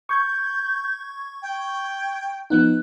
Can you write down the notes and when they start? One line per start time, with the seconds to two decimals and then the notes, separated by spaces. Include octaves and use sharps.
0.09 C#6 G6 G#6
1.42 G5
2.50 F3 B3 D#4 F#6